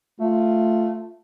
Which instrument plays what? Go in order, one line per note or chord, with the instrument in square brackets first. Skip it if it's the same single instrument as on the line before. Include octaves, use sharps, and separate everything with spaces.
[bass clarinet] A3 [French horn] F4